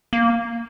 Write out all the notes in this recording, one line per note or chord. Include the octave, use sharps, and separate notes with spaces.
A#3